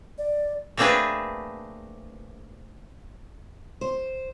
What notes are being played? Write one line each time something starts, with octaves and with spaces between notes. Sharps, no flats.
D5
A3 A#3 C4 D4 G#4 B4
C5